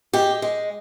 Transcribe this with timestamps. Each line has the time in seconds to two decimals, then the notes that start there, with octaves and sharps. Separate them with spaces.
0.13 G#3 G4
0.42 G#3